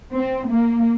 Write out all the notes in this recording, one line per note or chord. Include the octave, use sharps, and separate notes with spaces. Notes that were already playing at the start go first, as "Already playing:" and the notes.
C4
A#3